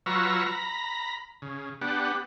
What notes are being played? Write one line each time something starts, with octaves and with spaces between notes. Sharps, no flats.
F#3 F4 B4 A#5 C#6 E6
A#5 B5
C#3
B3 D4 G4 F#5